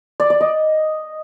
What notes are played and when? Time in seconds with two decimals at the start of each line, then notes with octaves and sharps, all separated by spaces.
0.20 D5
0.30 D5
0.41 D#5